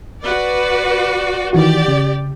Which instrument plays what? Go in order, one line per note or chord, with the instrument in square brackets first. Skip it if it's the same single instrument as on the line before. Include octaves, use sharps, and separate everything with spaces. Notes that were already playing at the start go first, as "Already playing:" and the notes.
[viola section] F#4 B4 D5
[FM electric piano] D#3 E3 F#4 [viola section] G4 D5
[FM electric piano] C#3